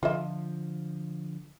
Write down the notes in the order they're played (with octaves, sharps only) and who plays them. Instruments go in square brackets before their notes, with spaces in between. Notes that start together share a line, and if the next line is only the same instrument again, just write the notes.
[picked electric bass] D3 F3 [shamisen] F4 D#5 E5